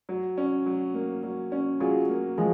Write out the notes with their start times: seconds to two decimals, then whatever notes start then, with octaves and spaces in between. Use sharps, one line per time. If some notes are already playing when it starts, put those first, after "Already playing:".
0.09 F#3
0.38 C#4
0.66 F#3
0.94 A#3
1.23 F#3
1.52 C#4
1.80 F#3 F4 G#4
2.09 A#3
2.38 F3 F#3 G#3